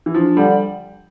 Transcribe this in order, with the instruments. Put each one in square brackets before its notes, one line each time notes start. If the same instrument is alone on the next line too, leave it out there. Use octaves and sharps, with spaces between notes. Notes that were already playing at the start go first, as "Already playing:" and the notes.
[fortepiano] E3
[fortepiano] F3 [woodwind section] D4
[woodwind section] D3 [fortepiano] G3